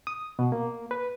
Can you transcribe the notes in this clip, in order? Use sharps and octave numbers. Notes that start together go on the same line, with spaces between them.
D#6
B2
A#3
B4